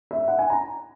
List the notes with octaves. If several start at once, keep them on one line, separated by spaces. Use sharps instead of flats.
E5
F#5
G#5
A#5